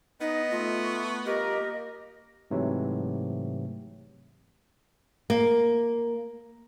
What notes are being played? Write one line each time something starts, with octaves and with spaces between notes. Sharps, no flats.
B3 D#4 D#5
A3 F4
C#6
G2 F4 G4 A#4 D#5
A#3
G#2 C3 E3 F#3 A3
A#3